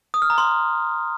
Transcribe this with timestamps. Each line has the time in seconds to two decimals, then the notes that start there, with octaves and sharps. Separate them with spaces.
0.14 D#6
0.22 F6
0.30 A#5
0.38 C6